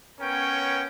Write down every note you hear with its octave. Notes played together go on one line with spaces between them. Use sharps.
B3 C#4 A#4 C#5 G5